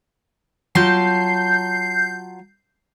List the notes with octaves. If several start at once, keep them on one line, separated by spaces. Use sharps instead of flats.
F#3 F4 A5 G6 C7